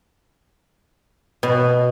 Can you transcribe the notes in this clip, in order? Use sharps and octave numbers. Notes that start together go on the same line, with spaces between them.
B2